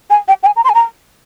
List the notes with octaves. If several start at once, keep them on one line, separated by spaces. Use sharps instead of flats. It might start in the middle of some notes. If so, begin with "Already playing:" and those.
G#5
G5
G5
G#5
A#5
C6
G#5
A#5